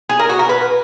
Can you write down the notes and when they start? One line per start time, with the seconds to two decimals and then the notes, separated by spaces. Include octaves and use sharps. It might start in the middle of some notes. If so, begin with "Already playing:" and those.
0.09 G#4
0.19 A#4
0.29 F#4
0.39 A#4
0.49 B4